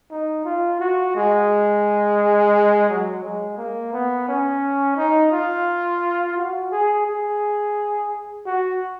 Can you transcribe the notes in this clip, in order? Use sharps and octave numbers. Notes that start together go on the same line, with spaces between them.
D#4
F4
F#4
G#3
F#3
G#3
A#3
B3
C#4
D#4
F4
F#4
G#4
G#4
F#4